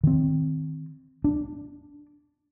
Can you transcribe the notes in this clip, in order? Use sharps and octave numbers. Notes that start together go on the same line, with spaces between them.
D#3 C4
D4